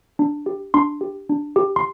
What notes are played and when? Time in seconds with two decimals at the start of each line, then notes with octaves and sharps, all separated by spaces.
0.19 D4
0.46 G4
0.74 D4 C6
1.01 G4
1.29 D4
1.56 G4
1.76 C6